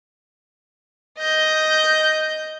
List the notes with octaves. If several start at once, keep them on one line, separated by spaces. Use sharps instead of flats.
D#5 G6